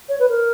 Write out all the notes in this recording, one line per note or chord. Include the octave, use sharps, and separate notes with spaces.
C#5
B4
A#4